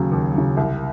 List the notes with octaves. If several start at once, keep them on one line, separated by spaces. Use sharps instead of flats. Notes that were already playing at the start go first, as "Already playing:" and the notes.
Already playing: D#2 C#3 F#3
D#2
C#3 F#3
C2